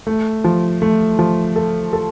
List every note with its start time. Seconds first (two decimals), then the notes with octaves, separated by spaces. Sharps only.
0.07 A3
0.44 F3
0.82 A3
1.19 F3
1.56 A4
1.93 A4